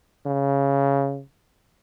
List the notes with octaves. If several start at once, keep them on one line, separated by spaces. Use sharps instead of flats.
C#3